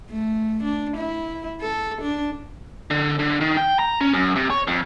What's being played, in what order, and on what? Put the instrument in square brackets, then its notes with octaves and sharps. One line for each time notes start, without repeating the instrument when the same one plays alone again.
[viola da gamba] A3
D4
E4
A4
D4
[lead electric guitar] D3
D3
D#3
G5
A#5
C#4
F#2
C3
C#5
F2